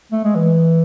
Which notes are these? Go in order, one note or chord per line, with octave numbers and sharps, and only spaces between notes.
A3
G#3
E3